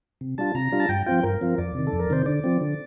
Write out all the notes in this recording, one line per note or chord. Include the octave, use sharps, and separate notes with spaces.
C3
G3 D4 F4 A5
C3 A#5
G3 D4 F4
A5
G2 G5
F3 C4 F4 G5
G2 A#4
F3 C4 F4
F2 D5
C3 D#3
A4
F2
A#4
C3 D#3 C5
D3 D5
F3 C4
D3